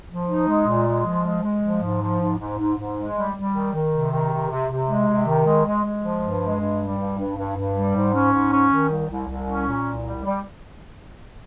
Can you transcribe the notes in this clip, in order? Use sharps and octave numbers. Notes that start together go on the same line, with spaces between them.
F3
D#4
G#3
A#2
G#3
F3
G#3
G#3
F3
G#2
F3
G#2
G#2
G#2
G#2
G#3
G3
G3
D#3
D#3
C3
D#3
C3
C3
C3
G#3
C3
D#3
G#3
G#3
G#3
F3
G2
G#3
G2
G3
G2
G2
G2
G2
G3
G#2
C#4
G#2
C#4
D#3
C2
C2
C2
C#4
A#2
C2
G3
G3